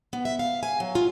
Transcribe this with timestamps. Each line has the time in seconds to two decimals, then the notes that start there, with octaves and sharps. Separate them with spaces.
0.13 B3
0.25 E5
0.39 F5
0.63 G#5
0.80 F#3
0.95 F4